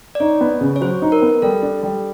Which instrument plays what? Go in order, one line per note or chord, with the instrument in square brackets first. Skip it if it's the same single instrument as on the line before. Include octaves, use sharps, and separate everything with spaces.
[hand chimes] D5
[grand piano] D#4 [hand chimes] C#5
[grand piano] B3
C#3
[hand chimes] C#5
[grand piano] F#3 [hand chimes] C5
[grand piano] D#4
[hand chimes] A#4
[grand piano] B3
[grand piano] G3 [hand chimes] A4
[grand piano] D4
G3